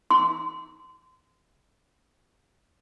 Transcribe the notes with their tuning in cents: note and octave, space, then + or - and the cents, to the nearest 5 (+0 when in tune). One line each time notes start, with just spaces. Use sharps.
C6 -30